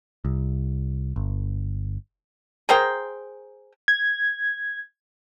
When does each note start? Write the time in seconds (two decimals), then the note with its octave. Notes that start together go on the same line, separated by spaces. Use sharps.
0.25 C2
1.16 G1
2.69 G#4 A#4 C5 G5
3.88 G#6